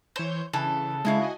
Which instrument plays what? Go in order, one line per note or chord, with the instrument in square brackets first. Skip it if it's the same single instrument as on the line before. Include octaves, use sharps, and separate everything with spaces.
[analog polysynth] E3 C#5 G6 [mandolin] C5
[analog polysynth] C#3 [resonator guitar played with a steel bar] E3 [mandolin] A4
[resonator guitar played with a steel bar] C#3 E4 F5 [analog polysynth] G#3
[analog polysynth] F#4 D#5 G#5